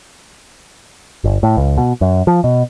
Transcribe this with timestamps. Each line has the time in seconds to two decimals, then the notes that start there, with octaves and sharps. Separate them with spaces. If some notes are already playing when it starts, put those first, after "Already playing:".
1.24 G1
1.43 A2
1.57 C#2
1.78 B2
2.01 F#2
2.27 F3
2.44 B2